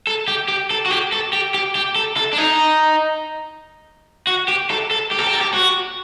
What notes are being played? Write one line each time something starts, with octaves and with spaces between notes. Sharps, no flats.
A4
G4
G4
A4
F#4
G4
A4
G4
G4
G4
A4
A4
D4
D#4
F#4
G4
A4
A4
G4
A4
G4
A4
G4
F#4